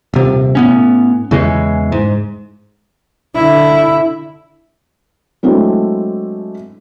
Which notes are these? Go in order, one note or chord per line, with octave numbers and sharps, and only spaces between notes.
D#1 C3
A2 B3 C#4
E2 C#3 E3 G#3
G#2
D3 E4
F#3 G#3 A3 C4 D4 E4